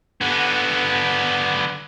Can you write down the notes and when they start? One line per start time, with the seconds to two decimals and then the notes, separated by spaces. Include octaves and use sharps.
0.21 D3 B3